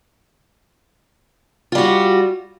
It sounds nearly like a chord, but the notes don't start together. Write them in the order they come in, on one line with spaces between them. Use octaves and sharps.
F4 G3 F#4